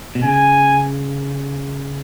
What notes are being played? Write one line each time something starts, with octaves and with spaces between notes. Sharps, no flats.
B2
C#3 G#5